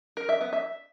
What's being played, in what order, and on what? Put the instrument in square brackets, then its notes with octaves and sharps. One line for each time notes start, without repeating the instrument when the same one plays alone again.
[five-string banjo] A#4
E5
B3
E5